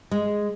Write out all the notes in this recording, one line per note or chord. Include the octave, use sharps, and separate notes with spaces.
G#3